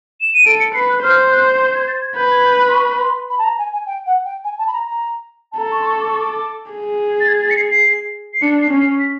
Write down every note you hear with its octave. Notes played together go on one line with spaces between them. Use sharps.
E7
D#7
A4 D7
C#7
B4 C7
F#6
C5 F6
F#6
G6
G#6
A6
G#6
B4 G6
G#6
G6
F#6
C6
C#6
B5
C6
B5
A5
A#5
G#5
G#5
G5
F#5
G5
G#5
A5
B5
A#5
A#5
A5
A4 A#5
C#6
C6
C#6
D6
C#6
D6
G#4
A6
G#6
A6
C#7
C7
C7
C7
D4 C#7
C7
C#4
C7
B6